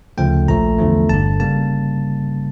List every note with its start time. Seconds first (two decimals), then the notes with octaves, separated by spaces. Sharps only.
0.18 D2 C#3 F3 A3 G5
0.48 A#1 A#2 F3 A3 A#5
0.78 E2 D3 F3 A3
1.09 G1 G2 D3 A5
1.40 C#3 G3 A#3 A5